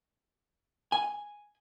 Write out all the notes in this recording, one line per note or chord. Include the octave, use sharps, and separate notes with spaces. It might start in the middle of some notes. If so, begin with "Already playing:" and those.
G#5